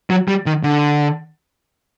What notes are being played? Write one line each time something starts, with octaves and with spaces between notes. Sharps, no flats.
F#3
G3
D#3
D3